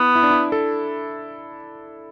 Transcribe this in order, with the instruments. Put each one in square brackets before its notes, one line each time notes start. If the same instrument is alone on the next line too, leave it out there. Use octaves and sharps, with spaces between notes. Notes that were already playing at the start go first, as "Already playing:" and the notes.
Already playing: [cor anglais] B3 [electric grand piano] E4
[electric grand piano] E4
D4
E4
A4